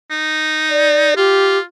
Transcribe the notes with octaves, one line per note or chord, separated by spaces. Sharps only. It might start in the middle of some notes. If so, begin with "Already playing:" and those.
D#4
D5
F4 G4